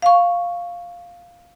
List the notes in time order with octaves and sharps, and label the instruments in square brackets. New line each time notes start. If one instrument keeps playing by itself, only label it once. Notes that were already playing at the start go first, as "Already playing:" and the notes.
[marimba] F5 C#6